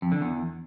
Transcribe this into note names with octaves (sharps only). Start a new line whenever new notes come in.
F2
D3
E2